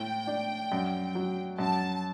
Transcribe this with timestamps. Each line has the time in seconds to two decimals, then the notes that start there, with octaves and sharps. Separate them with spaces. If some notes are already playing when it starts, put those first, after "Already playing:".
Already playing: A2 G5
0.27 D4
0.72 F#2
1.15 F#3
1.59 F#2 A5